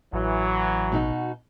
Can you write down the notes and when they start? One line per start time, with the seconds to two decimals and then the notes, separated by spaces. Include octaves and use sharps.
0.13 A1 E3 F#3
0.92 B2 D#4 F#4